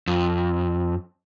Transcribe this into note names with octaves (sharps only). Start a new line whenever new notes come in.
F2